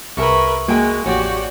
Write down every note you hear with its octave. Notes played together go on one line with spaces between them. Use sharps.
C2 G#4 A#4 B4 E5 C#6
G#3 A#3 F#4 G5 G#5
A1 F2 F#4 G4 C#5 D5